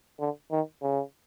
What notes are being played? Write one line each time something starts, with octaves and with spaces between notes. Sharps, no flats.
D3
D#3
C#3